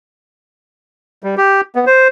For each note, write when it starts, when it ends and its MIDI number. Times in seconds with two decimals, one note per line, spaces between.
1.24 1.35 55
1.37 1.61 67
1.75 1.85 59
1.87 2.08 72